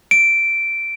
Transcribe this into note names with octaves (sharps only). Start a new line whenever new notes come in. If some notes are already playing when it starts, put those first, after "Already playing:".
D7